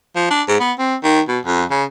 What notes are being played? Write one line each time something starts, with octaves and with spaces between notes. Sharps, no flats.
F3
D4
G#2
B3
C4
D#3
B2
F2
C#3